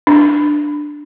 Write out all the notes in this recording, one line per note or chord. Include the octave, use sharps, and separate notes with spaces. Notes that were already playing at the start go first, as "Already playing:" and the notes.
D4